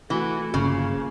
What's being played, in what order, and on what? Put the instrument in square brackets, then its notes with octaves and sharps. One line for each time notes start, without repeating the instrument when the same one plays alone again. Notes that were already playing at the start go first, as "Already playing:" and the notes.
[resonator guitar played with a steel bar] E3 [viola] A3 F#4
[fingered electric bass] G1 [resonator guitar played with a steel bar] C#3 [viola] F3 A#3